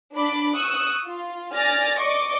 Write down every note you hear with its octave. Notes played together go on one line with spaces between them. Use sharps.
D4 B5 D6
C#6 D#6 E6 F#6
F4
D5 G#5 F6 A6 A#6
D5 D#5 C#6 D6